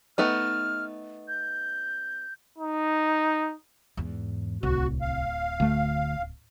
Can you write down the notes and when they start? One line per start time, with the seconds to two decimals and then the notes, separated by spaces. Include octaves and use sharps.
0.18 A3 B3 D#4 F6
1.28 G6
2.58 D#4
3.97 E2 G#2
4.63 D1 C2 F#4
5.01 F5
5.60 D2 A3